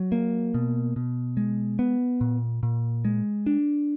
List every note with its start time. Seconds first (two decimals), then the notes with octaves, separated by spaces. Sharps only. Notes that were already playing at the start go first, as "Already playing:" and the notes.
Already playing: F#3
0.12 A#3
0.54 B2
0.96 B2
1.37 G#3
1.79 B3
2.21 A#2
2.63 A#2
3.05 G#3
3.46 D4